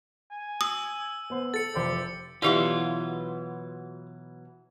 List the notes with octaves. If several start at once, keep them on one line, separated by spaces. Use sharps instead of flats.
G#5
D#6 E6
B3 C5
A4 A6 C#7
F1 G4 C5 D5
B2 E3 F#3 E4 F4 G4 D5